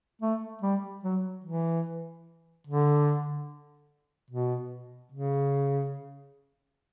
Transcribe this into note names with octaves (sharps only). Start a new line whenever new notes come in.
A3
G3
F#3
E3
D3
B2
C#3